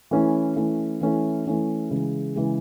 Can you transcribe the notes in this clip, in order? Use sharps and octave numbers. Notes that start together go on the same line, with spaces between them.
E3 A3 C#4 E4
E3 A3 C#4 E4
E3 A3 C#4 E4
E3 A3 C#4 E4
C#3 E3 G#3
C#3 E3 G#3